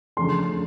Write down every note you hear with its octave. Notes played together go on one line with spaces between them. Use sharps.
C#3 F3 A3 D4 C6